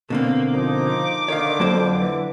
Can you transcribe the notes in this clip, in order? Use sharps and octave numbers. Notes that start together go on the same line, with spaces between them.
B2 D3 A#3 C4
F3 A#3 D#4 D6
D3 D#3 C#5 F5
F2 F#3 A#3 C5
E3